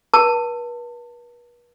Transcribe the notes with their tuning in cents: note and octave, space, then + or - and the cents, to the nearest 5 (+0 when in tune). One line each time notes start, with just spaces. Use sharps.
B4 -40 A5 +30